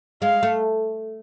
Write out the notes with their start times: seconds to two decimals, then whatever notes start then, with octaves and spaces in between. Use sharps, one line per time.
0.22 G#3 F5
0.43 A3